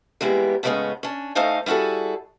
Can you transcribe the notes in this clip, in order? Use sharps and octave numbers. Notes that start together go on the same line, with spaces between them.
E3 G3 G#3 A#3 B3
A2 C#3 G3 G#3 B3 C#4
C#4 D4
A2 A3 D#4 C5 F5 G#5
G3 E4 F#4 G#4 A4